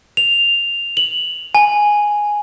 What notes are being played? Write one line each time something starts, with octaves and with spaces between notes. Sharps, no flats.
F7
F#7
G#5